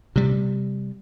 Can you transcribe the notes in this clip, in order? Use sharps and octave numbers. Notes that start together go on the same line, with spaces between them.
C3 G3